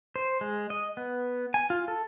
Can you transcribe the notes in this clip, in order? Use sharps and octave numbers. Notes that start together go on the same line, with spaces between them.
C5
G#3
D#5
B3
G#5
F4
A4